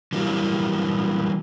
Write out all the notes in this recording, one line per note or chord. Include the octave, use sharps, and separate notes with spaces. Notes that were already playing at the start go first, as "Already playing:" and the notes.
E3 F#3 G3 A#3